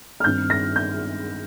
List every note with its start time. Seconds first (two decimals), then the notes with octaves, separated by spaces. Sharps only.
0.20 F6
0.24 G2 D#3 C4 D#4 G6
0.50 A#6
0.76 G6